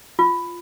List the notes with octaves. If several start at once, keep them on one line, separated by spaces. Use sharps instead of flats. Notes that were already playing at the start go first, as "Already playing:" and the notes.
F4